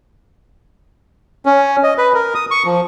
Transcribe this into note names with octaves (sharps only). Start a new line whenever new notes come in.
C#4
D#5
B4
A#4
D#6
C#6
F3